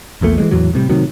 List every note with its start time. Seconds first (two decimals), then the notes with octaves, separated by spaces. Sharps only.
0.21 A#1 E2 A#2 A3
0.38 E3 G3 G#3
0.51 E2 A2 E3 F#3
0.74 A2 C3 G3
0.89 A2 C3 D#3 F#3